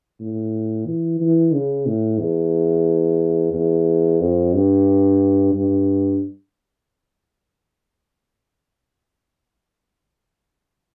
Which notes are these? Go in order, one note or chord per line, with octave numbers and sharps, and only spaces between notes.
A2
E3
E3
C#3
A2
E2
E2
F2
G2
G2